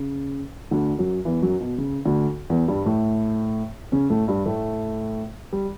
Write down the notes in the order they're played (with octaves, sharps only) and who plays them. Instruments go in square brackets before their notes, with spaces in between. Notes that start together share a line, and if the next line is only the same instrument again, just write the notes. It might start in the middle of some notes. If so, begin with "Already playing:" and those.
Already playing: [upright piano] C#3
D2 D3
F#2 F#3
E2 E3
F#2 F#3
B2
C#3
D2 D3
E2 E3
G2 G3
A2 A3
C#3 C#4
A2 A3
G2 G3
A2 A3
G3